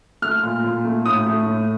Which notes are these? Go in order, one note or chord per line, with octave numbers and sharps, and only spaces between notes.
A3 F6
A#2
A#2
A3
A2 D#6
A3
A2